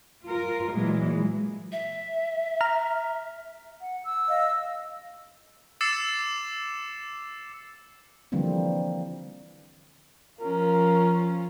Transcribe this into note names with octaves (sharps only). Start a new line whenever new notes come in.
F4 A#4
A#2 E3 F#3 G#3
E5
A#5 F6
F#5
E6
D#5 F5
D6 E6 A6 C7 C#7 E7
D3 E3 F3 G3 A#3 C4
F3 C#4 F4 A#4